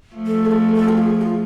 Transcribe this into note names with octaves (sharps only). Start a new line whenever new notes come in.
F3 A3
A4
G#4
A4
A4
F4
G#4
F4